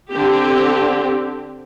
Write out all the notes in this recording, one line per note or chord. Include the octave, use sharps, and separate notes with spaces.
D3 C4 G4